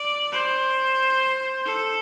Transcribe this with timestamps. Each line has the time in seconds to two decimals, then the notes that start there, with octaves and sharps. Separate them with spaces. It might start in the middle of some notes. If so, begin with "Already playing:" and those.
Already playing: D5
0.32 C5
1.66 A4